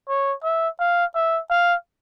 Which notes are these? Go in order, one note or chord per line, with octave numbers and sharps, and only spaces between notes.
C#5
E5
F5
E5
F5